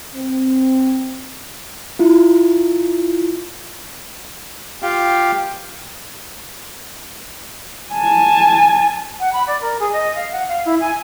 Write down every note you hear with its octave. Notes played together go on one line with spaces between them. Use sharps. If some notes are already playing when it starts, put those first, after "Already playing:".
C4
E4 F4
F4 G4 F5 G5
G#5 A5
F#5
B5
D5
A#4
G#4
D#5
F5
F#5
F5
E4
G#5